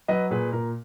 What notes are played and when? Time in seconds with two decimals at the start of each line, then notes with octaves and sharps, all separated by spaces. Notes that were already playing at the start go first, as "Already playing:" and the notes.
0.08 F#3 B4 D#5
0.31 A#2 G#4 B4
0.52 A#2 A#4